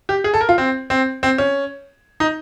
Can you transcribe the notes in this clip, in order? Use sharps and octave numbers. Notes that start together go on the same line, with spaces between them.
G4
G#4
A4
A#4
F4
C4
C4
C4
C#4
D#4